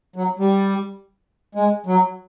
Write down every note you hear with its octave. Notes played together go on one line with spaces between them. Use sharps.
F#3
G3
G#3
F#3